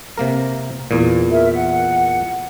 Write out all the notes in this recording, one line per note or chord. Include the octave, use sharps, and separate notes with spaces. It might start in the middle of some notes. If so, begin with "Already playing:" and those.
C3 A#3 A#4
E2 A#2
A#4 E5
F#5